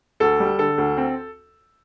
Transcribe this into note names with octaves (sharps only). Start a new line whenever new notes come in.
D2 A4
G3
D3 A4
D2
C4